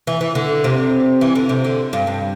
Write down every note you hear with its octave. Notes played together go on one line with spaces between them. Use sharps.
E3
E3
D3
C3
E3
D3
C3
D3
G2
G2